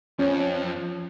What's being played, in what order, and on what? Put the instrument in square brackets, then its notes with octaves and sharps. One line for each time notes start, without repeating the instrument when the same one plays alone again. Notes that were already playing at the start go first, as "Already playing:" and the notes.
[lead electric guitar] F2 [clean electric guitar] F3 [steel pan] C#4